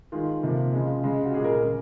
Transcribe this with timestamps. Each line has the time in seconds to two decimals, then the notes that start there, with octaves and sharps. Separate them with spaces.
0.12 D#3 G#3 F4
0.42 C3 F3 A#3
0.73 C#3 F3 G#3
1.03 C#3 G#3
1.25 F#4
1.34 A#2 G#3 G#4
1.44 A#4
1.54 A#4
1.64 C#3